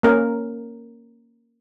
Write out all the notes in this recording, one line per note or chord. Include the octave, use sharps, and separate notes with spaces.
A#3 C#4 A#4